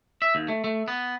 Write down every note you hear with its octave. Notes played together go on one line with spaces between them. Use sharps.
E5
D#2
A3
A3
B3